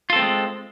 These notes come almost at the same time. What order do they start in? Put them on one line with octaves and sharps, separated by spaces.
F4 A4 C4 A3 G#3